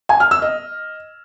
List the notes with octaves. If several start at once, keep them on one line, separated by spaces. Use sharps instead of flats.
G#5
F6
E6
D#5